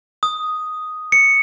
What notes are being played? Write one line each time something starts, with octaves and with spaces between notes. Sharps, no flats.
D#6
C#7